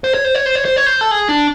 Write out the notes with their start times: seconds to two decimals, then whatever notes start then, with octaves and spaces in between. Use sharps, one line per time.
0.04 C5
0.14 C#5
0.24 C5
0.35 C#5
0.46 C5
0.55 C#5
0.65 C5
0.76 C#5
0.86 C5
1.01 A4
1.11 G#4
1.29 D4